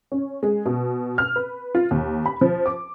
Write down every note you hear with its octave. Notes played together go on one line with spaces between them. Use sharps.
C#4
G#3
B2
F6
B4
F4
D#2
B5
F3
D6